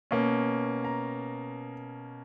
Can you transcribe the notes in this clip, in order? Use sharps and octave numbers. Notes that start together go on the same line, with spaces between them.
B2 A#3 C#4
A#5